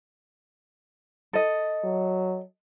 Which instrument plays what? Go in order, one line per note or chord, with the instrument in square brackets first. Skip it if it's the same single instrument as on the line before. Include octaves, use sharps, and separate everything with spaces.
[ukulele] A4 D#5
[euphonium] F#3